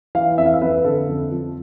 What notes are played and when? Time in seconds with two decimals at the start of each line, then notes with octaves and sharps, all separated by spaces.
0.15 E3 F5
0.38 F2 E5
0.46 F5
0.54 E5
0.62 F2 B4
0.84 D3 A4
1.08 F2
1.32 F3